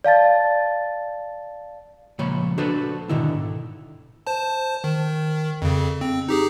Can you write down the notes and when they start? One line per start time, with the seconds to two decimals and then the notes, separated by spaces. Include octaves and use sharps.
0.04 D5 F5 A5 A6
2.19 C#2 A#2 F3 C#5 B5
2.58 D4 F#4 A4 B4 C5 D5
3.09 G#2 B2 D3 D#3 E4
4.27 C5 A5
4.84 D#3
5.62 F2 C#3
6.01 C4
6.28 D#4 G4 G#4